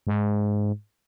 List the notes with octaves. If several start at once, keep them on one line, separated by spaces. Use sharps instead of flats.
G#2